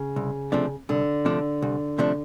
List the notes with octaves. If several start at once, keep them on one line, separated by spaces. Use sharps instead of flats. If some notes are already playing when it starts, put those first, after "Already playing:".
Already playing: C#3
C2
C3 F3 A3 D4
C2 D3
C3 F3 A3 D4
C2
C3 F3 A3 D4